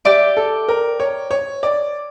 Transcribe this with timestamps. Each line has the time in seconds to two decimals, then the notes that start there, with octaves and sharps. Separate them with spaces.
0.05 G4 D5 E5 G5 D6
0.37 A4
0.68 A#4
1.00 C#5
1.31 C#5
1.63 D5